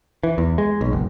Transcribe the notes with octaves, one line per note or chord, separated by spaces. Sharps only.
E3
E2
G#3
B1
F#1